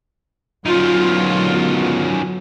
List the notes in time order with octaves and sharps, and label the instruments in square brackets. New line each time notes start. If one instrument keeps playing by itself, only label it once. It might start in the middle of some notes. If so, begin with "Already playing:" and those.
[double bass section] D3 F#3 B3 [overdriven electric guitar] D#3 C#4 [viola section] F4